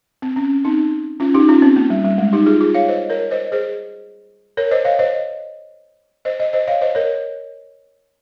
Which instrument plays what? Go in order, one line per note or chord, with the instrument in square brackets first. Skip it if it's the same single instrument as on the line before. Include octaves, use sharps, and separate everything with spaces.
[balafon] C4
C#4
C4 D#4
C#4 F4
D#4 G4
C#4 F4
C4
A#3
G3
G3
G#3
D#4 G4
F4 G#4
F4 G#4
C#5 F5
C5 D#5
A#4 C#5
C5 D#5
G#4 C5
A#4 C#5
C5 D#5
C#5 F5
C5 D#5
C5 D#5
C5 D#5
C5 D#5
C#5 F5
C5 D#5
A#4 C#5